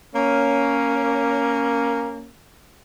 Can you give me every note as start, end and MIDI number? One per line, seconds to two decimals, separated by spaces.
0.14 2.30 58
0.14 2.30 61